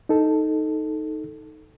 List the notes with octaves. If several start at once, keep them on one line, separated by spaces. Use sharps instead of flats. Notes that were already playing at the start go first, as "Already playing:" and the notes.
D#4 A4